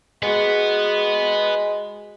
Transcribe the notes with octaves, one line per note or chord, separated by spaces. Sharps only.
G#3 F#4 G#4 B4 F#5